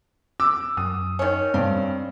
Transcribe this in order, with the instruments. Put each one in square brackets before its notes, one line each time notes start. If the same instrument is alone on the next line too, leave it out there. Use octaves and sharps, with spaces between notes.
[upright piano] D6 E6
[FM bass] F#2 [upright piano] D#6
[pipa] D#3 C#4
[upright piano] G2 [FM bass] C4